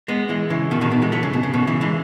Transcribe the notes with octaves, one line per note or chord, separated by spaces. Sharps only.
G#3 B3
E3 G#3
C#3 E3
B2 D#3
B2 D#3
B2
E3 G#3
F#3 A3
C#3
B2
C#3
B2 D#3
C#3 E3
E3 G#3